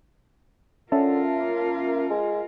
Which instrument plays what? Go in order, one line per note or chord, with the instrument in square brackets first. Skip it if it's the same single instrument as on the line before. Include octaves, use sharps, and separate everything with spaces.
[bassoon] D3 [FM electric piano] C#4 E5 A5 [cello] F4 A#4
[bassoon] A#3
G#3